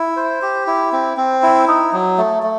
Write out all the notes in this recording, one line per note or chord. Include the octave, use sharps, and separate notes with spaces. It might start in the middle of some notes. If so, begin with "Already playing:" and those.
Already playing: E4
C5
G4
E4
C4
C4
E4
D#4
F#3
A3
A3